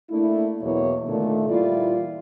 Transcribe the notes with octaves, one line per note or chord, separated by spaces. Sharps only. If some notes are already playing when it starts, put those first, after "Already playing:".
A3 A#3 D4 E4
E2 B2 E3 F#3 A#3 C#5
A#2 D3 D#3 A3
A#2 E3 G3 E4 F4 D5